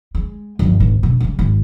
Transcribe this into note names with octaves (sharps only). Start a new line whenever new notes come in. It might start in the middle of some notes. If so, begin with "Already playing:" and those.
G#3
G1 F3
G#1
E1
C#3 G3
G#1